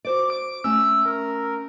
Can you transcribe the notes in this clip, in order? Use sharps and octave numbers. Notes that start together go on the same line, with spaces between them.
F#4 C5 D5 D6
D7
A3 C#4 E6
A#4